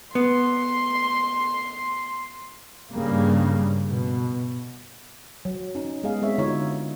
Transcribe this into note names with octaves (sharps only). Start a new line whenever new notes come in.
B3 C6
G2 C#3 G3 A#3
B2
F#3
C#4 D#4
G#3 B3 G#4 D#5 F5
G#3 C4 C#5 E5
D3 D#4 F4 F#4 C#5